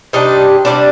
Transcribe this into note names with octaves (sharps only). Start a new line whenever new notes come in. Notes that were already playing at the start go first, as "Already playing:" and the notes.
C3 G3 D4 D#4
C3 G3 D4